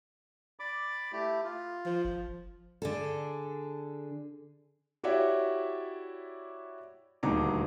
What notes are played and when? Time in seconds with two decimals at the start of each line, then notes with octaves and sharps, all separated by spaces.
0.60 D5 B5 D6
1.12 A3 E4 G4
1.44 F4
1.86 F3
2.05 G1
2.82 D3 G#4 A4
5.04 E4 F#4 G4 C#5 D5 E5
7.23 D#1 D2 D4 D#4 A#5 D6